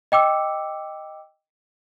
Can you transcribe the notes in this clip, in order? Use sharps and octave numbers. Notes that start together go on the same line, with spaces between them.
D#5 G5 D6 E6 C#7